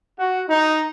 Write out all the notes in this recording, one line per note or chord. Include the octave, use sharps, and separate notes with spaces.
F#4
D#4